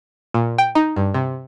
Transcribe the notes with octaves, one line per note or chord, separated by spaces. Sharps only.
A#2
G5
D#4
G2
C3